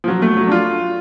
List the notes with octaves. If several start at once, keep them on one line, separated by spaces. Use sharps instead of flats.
F3
F#3
A3
F#3
D4
F4